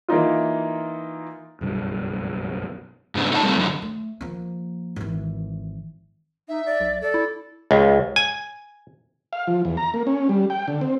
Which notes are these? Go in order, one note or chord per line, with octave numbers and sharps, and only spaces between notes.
E3 A#3 D#4 F4
F#1 B1 G2
G#2 C#3 B3 D4
A3 D#4 F5 A5
G3 A3 A#3 C4
F#2 D3
A3
F3 A#3
G#1 E3
D#4 E5
D5
B1
A4 D5
E4
C#2
G#5
F5
F3
E2
A#5
A#3
C#4
G3
G5
D3
C4